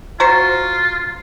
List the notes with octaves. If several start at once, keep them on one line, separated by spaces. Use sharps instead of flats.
F4 F#4 C5 A#5